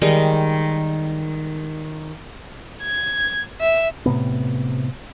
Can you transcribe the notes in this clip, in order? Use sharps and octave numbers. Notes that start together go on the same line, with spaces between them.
D#3 G3 G#3 D#4
G#6
E5
A2 C3 B3